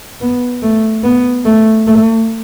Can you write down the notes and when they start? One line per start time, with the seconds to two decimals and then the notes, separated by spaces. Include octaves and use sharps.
0.21 B3
0.62 A3
1.04 B3
1.45 A3
1.87 A3